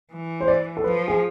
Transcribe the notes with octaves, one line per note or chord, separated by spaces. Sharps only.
E3
C5
D5
A4
F3 B4
G#4